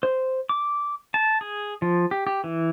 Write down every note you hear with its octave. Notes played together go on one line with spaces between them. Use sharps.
C5
D6
A5
G#4
F3
G4
G4
E3